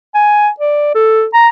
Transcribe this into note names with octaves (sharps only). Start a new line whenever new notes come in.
G#5
D5
A4
A#5